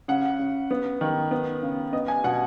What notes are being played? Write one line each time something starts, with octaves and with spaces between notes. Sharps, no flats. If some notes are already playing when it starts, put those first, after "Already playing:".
C#3 F#5
C#3
B3
D#3
B3
C#3
B3 D#5
G#5
B2 F#5